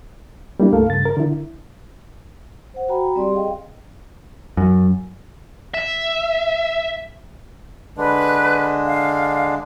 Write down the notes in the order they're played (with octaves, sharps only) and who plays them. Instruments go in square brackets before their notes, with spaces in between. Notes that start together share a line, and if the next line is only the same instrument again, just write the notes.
[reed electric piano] G3 A#3 D4 E4
C#2 G2 A3 A4 A#4 F5
G2 C#3 A6
A#4
D3 E4
[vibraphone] C5 F#5
F#4 G5 A#5 B5
G3 C4 G4 D5 C6
G#4 D#5 F5 G5
[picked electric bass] F#2
[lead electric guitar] E5
[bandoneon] D3 G#3 D4 [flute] B4
[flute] F5